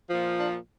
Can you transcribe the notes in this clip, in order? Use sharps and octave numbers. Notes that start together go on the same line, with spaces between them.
A#2 F3
D4